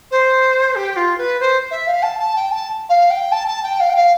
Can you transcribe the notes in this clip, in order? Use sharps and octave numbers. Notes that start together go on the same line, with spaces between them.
C5
G4
F4
B4
C5
E5
F5
A5
A5
G5
A5
F5
G5
A5
A5
G5
F5
G5
F5